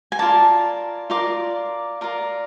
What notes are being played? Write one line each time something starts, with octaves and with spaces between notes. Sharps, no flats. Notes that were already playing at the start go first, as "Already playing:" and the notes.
G#5
F4 A#4 D5 A5
F4 A#4 D5 D6
F4 A#4 D5